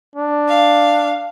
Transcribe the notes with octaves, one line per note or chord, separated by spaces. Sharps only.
D4
F5